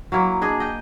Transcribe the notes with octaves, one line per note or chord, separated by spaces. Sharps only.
F#3 A#3 E4
D4 G#4 D#5
D#5 G5